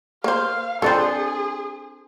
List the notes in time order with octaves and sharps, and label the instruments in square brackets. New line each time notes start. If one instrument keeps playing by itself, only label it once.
[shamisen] A#3 C5 [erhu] F5
[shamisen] C4 D4 F4 [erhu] G#4 [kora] A4 C5